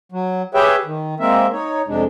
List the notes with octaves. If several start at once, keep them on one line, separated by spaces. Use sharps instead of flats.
F#3
G4 G#4 B4 C#5 E5 G5
D#3
G#3 A#3 C4 A#4 E5
D#4 C#5
F2 C3 G#3 D4